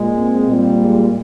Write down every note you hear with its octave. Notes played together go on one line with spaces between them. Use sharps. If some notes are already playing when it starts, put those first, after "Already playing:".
Already playing: A#2 G#3
C4
A#2 G3
G#3